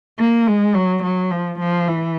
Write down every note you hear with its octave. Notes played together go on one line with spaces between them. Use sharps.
A#3
G#3
F#3
F#3
F3
F3
E3